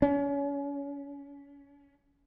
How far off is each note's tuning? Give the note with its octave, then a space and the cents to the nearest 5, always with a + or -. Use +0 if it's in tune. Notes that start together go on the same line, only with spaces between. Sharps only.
C#4 +30